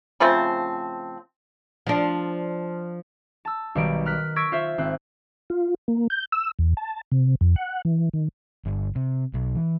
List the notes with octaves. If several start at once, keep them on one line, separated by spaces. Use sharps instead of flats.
C#3 F3 A3 C4
F3 D4
A5 E6
B1 D#3 G3 D7
A#4 F6 F#6 B6
C#6 E6 G#6 A#6 B6 D7
F4 C5 E5
G#1 C4 F#6
F4
A#3
G6
E6
E2
A5
C3
F2
F#5
E3
D#3
G1
C3
B1
E3